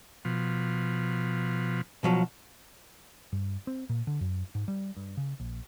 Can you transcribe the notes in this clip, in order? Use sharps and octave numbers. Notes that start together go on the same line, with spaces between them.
B2 F3
B2 F3 F#3
G2
C4
A#2
D3
F#2
G#2
G3
G2
C#3
A#1